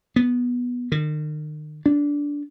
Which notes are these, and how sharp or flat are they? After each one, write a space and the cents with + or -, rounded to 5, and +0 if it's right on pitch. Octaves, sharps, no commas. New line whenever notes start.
B3 -10
D#3 -40
D4 -15